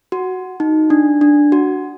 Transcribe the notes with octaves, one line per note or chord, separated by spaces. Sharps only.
F#4
D#4
D4
D4
F#4